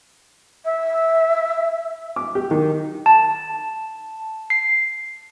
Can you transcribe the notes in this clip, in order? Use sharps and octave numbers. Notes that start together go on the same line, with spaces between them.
E5
D6
G4
D#3
A5
C7